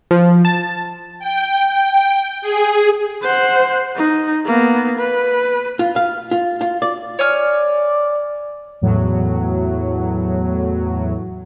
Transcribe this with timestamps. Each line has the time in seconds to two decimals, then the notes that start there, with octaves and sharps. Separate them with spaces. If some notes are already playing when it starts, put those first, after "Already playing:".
0.11 F3
0.45 A5
1.19 G5
2.42 G#4
3.23 C5 F#5
3.96 D#4
4.46 A#3 B3
4.99 B4
5.79 F4
5.96 F5
6.31 F4
6.61 F4
6.82 D5
7.19 C#5 D5 G#5 F6
8.82 E2 A2 F#3